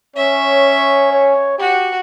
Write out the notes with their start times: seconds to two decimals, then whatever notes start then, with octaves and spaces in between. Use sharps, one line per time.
0.16 C#4 C#5 E5
1.13 C#5
1.59 F#4 G4